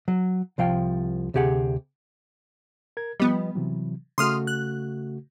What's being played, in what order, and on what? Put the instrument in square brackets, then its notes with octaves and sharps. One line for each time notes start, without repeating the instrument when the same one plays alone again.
[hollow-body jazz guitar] F#3
C2 F3 F5 G5
D2 C3 G4 G#4 F#5
[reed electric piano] A#4 G#6
[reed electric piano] F3 B4 D#5 [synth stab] G3 B3
[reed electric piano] C3 E3 F#3
[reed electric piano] C#3 A3 F#4 [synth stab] C6 D#6 F6
[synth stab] F#6